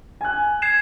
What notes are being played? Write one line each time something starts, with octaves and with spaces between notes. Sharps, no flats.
G#5 F#6
G#6 C7 E7